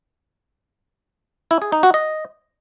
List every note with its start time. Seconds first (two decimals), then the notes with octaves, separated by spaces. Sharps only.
1.51 E4
1.62 G#4
1.72 D#4
1.83 F#4
1.94 D#5